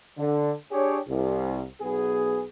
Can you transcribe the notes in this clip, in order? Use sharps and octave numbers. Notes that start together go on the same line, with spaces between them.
D3
D4 G4 G#4 C#5
C2
B1 B3 G#4